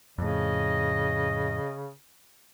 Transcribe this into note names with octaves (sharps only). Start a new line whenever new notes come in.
F2 A2 C#3 D#5